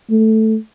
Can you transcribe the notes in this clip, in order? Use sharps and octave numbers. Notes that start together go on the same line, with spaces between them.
A3